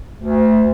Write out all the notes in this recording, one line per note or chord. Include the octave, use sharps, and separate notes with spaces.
D2